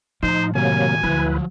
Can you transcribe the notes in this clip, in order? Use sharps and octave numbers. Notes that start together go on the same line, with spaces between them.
A2 F3 D#4 C5
C3 D#3 F#3 A#3 F#4 G#5
D2 F3 F#3 E4 B4